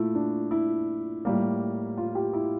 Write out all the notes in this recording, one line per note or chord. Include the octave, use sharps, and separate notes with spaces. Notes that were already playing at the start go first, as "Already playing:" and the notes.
Already playing: A#2 A3 E4
D4
E4
A2 G3 A#3
F4
G4
E4